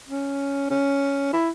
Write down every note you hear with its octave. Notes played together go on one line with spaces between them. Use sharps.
C#4
C#4
E4